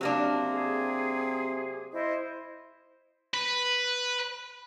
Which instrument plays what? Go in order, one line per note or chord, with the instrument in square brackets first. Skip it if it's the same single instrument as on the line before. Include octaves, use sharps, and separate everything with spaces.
[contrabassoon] C3 [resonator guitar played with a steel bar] F#3 A#3 D4
[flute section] G#4
E4 C5 D#5
[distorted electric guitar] B4